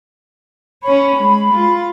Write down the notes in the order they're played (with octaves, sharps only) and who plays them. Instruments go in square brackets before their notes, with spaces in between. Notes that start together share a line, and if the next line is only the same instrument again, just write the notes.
[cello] C#4 C#5 [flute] B5
[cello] G#3
F4